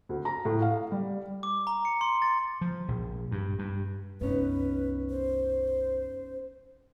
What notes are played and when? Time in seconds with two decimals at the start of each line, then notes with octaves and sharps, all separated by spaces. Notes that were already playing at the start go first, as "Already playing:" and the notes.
0.09 D2
0.25 A#5
0.45 A2
0.62 F5
0.92 G3
1.43 D6
1.67 A#5
1.85 C#7
2.01 C6
2.22 A6
2.61 F3
2.88 A#1
3.32 G2
3.59 G2
4.21 C2 F#2 B3 C#4 D#4 B4
5.10 C5